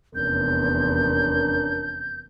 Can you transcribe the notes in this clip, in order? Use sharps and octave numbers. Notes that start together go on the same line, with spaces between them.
F1 E2 C#4 D4 A#4 G6